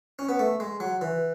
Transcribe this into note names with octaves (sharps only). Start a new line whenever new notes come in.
C#4
B3
A3
G#3
F#3
E3